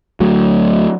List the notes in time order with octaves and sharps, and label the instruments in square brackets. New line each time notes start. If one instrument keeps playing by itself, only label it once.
[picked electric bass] D2 F#3 A3